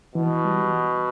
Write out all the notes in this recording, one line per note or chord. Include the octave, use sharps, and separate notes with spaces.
B2 E3
G3